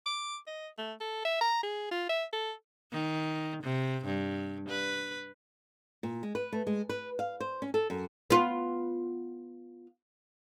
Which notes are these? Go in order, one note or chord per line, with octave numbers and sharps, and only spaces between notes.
D6
D#5
A3
A4
E5
A#5
G#4
F4
E5
A4
D#3
C3
G2
B4
A#2
G#3
B4
A3
G#3
B4
F5
C5
C#4
A4
F#2
B3 F4